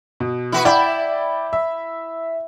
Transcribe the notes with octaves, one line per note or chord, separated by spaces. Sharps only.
B2
E4 F#4 B4
E4 D5 G5 B5
E5